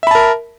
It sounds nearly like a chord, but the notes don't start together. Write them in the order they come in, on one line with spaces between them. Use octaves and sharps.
E5 B5 A5 A#4